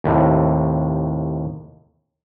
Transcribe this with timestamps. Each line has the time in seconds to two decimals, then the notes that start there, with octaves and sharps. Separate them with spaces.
0.04 D#2 A2 C3